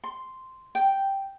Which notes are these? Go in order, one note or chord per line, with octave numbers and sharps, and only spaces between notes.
C6
G5